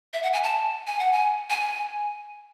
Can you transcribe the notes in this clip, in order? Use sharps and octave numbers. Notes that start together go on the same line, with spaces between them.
E5
F#5
G#5
A5
G#5
F#5
G#5
G#5